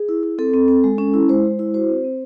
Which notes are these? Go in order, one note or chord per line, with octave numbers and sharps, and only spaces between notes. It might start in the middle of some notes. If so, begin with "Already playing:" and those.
Already playing: G#4
E4
E4
C4 A4
C4
C4
G#3
C#4
E4
G#3 C5
G#3
E4
F#4 C5
C4
C4